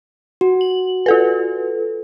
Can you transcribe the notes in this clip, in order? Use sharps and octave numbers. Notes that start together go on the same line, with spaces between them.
F#4
F#7
F4 A4 B4